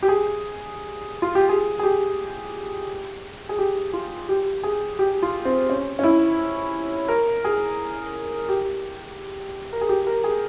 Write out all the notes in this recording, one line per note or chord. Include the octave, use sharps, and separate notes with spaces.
G4
G#4
F4
G4
G#4
G#4
G4
G#4
G4
F4
G4
G#4
G4
F4
C4
C#4
C#4
E4
A#4
G#4
G4
A#4
G#4
G4
A#4
G#4